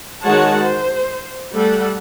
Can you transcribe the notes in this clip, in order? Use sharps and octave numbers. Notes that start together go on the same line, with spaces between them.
D#3 G#3 F#4 C#5 F#5 A5
C5
G3 A3 A4 F#5